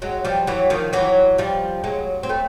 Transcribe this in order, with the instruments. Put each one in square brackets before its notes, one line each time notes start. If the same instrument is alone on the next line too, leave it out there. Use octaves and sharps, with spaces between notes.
[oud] F#3 G#3
F3 G3
E3 F#3
D#3 F3
E3 F#3
F3 G3
F#3 G#3
C4
A3 B3